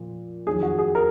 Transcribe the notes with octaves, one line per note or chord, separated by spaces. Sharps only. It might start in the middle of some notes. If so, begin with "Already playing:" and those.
Already playing: A#2 F3
F2 D#3 F#3 G#4
F#4
G#4
A#4